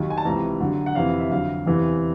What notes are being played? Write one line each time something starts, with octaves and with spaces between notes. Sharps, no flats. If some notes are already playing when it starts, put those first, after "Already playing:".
Already playing: D#2 D#3 F#3
G#5
A5
C#2 C3 E3 A#5
D#2 D3 F#3
F#5
F2 C3 E3 F5
E5
F2 D3 F#3 F5
E2 C3 E3